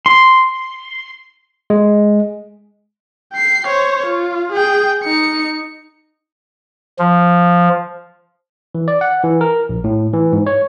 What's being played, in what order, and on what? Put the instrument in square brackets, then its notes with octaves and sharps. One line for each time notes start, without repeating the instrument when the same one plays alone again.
[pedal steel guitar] C6
[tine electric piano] G#3
[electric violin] G5 C7
C5 C#5
F4
G#4 G5
D#4 C#7
[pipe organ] F3
[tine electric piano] E3
D5
F#5
E3
A#4
A#1
A2
E3
G#2
C#5